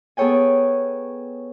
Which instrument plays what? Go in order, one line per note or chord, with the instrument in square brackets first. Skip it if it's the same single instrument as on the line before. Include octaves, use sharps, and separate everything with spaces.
[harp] B3 G#4 A4 C#5 G5 G#5